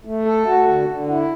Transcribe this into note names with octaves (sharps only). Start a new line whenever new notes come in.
A3
A4
F#4
D3
D3
E4